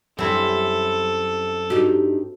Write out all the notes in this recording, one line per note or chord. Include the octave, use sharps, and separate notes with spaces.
F#2 G3 C4 E4 A4
G2 D#4 F#4 G4